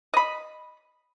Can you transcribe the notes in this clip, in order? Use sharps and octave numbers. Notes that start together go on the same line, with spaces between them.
D#5 B5